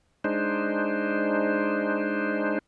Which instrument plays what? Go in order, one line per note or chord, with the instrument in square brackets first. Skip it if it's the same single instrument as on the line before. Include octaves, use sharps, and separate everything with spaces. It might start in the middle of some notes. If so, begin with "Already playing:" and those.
[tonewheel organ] G#3 D4 D#4 C5